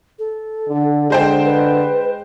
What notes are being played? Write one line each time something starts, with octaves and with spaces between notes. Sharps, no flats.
A4
D3
D3 G#3 C5 G5
B4